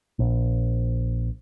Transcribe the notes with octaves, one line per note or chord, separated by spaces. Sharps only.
A#1